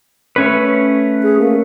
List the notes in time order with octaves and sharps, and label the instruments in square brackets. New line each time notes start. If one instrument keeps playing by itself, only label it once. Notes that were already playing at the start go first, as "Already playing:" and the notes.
[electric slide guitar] A3 C#4 B4
[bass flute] G#4
A#3